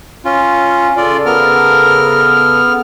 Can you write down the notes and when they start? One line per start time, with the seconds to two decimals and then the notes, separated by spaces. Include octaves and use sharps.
0.25 C#4 F4
0.97 C#3 F4 A4 D5
1.26 B3 A#4 F6